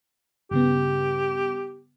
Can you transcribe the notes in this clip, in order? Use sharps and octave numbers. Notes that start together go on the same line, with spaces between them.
G2 C#3 B3 G4